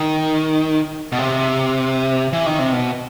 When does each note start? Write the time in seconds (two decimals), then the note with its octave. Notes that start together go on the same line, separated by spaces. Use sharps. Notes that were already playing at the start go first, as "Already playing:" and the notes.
Already playing: D#3
1.12 B2
1.19 C3
2.33 E3
2.46 D#3
2.59 C3
2.73 B2